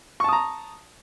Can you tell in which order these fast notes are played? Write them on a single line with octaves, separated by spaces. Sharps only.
C#6 A5 D#6 A#5